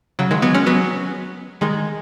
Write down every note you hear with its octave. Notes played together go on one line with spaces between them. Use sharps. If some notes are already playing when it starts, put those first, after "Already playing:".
C#3 F#3
D#3 G#3
F#3 B3
G#3 C#4
F#3 B3
D#3 G#3